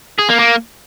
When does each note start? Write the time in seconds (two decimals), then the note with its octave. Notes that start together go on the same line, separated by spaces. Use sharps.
0.19 G#4
0.29 A#3
0.40 A#3